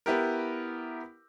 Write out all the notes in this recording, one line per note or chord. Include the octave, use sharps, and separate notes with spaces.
B3 E4 G4 A#4